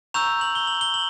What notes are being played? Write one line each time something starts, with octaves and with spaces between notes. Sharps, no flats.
A#5 C#6 E6 G6 F7
F#7
G7
F#7
G7
F#7